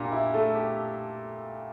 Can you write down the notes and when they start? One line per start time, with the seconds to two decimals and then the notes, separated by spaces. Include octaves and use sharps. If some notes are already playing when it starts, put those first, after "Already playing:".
Already playing: A#2 D4 G4
0.11 E4
0.34 A3 A4
0.55 G4